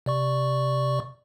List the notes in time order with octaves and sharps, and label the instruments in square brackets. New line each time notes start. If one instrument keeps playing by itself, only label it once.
[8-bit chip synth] C3 D5 C#6